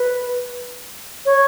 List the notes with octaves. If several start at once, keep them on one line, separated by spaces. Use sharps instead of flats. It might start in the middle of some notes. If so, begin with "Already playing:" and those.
Already playing: B4
C#5